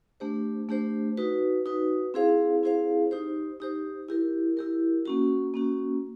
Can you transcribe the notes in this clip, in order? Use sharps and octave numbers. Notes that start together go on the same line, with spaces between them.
A3 D4 G4 C5
A3 D4 G4 C5
D#4 F#4 B4
D#4 F#4 B4
C4 E4 G#4 C5 F5
C4 E4 G#4 C5 F5
D#4 G4 C5
D#4 G4 C5
E4 G4 A#4
E4 G4 A#4
A#3 C#4 F#4
A#3 C#4 F#4